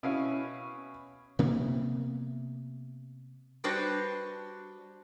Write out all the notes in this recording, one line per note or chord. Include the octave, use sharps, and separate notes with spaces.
B2 C#4 E4 C#5 F5
C3 A#3 B3
G3 D4 F#4 G4 B4 C5